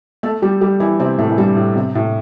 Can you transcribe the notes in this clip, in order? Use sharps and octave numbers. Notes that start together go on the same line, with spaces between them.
A3 A4
G3 G4
G3 G4
E3 E4
C3 C4
A2 A3
E3
G2 G3
A2
C3
A2